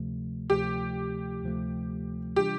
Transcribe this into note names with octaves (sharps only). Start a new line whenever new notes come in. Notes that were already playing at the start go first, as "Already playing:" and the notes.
Already playing: D2 C3 F3 A3
D2 C3 F3 A3 G4
D2 C3 F3 A3
C3 E3 G3 D4 F4 G4